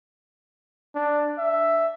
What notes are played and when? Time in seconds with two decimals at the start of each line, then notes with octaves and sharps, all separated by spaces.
0.95 D4
1.38 E5